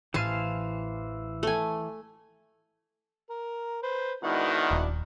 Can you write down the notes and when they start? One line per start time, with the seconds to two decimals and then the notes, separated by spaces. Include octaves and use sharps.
0.14 A1 E3 C5 F5 G#5 A5
1.43 A3 G#5
3.30 A#4
3.83 B4 C5
4.23 G#2 B2 D#3 D4 E4 F#4
4.71 D#1